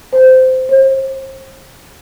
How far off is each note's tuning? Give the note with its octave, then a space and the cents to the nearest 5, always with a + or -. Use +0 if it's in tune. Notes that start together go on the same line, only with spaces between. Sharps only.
C5 -15
C5 +35